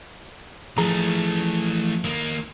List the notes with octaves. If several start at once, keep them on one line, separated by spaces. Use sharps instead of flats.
E3 F3 A3 G#4 A#5
D#3 A#3